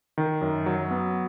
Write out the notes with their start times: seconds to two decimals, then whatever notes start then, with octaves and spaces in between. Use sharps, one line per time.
0.18 D#3
0.41 F#2
0.66 F#3
0.91 B3